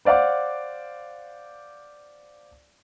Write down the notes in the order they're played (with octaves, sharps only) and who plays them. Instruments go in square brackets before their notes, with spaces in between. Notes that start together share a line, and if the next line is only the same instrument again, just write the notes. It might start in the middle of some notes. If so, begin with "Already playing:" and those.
[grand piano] C5 D5 F5 F#5 D6